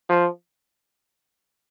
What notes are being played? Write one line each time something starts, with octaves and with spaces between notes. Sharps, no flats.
F3